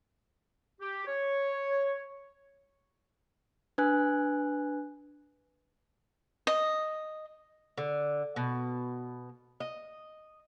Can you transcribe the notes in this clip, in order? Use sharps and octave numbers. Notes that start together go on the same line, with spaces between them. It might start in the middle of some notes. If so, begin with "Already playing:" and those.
G4
C#5
D4 B4 G#5 F#6
D#5
D3
B2
D#5